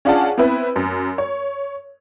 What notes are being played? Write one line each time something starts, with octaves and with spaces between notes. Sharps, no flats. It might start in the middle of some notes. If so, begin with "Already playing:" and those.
C#4 D4 F4 G#4 F#5 A5
B3 C4 E4 B4
F#2
C#5